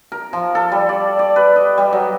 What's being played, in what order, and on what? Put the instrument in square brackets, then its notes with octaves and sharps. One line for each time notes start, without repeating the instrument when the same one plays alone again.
[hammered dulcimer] A#4
F3
A4
G3
D5
D5
B4
D#5
G3
F#3